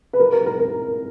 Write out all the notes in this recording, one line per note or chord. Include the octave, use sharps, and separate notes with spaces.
B4
A#4
A#4
A#4
A#4